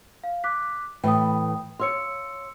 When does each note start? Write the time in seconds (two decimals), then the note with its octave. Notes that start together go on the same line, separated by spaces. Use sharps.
0.24 F5
0.44 D6 F#6 B6
1.04 A2 E3 B4 G5 D#6
1.79 C#5 F5 C6 E6 C#7